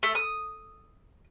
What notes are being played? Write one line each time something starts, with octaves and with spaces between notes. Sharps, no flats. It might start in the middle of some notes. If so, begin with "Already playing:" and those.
A3
D#6